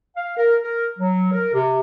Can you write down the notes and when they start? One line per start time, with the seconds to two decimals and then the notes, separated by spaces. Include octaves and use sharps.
0.16 F5
0.37 A#4
0.63 A#4
0.99 F#3
1.32 A#4
1.53 C3